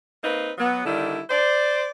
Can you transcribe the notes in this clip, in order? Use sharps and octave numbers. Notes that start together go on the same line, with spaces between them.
A#3 C4 D#4 B4
F#3 B3
D3 D#3 G3 E4
C5 D5